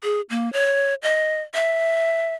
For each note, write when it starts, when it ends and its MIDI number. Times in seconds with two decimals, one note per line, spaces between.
0.03 0.21 68
0.30 0.51 58
0.53 0.94 73
1.03 1.41 75
1.54 2.35 76